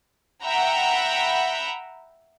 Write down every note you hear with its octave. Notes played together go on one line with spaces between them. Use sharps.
E5 F#5 G5 A#5 B5